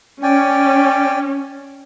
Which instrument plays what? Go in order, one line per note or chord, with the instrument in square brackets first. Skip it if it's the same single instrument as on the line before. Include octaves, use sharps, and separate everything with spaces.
[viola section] C#4 [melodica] D5 G5 G#5